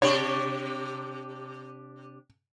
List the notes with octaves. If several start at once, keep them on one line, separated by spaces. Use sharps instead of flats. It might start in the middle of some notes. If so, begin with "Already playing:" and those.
C3 D4 G4 C#5